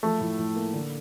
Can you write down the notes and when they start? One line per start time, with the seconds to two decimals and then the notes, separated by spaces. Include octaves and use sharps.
0.03 F3 A3
0.21 A2
0.38 A2
0.56 A#3
0.74 D3